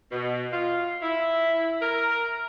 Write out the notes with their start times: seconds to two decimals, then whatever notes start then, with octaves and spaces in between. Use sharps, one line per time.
0.12 B2
0.53 F4
1.02 E4
1.82 A#4